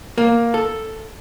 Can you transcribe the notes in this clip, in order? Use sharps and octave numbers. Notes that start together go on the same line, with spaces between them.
A#3
A4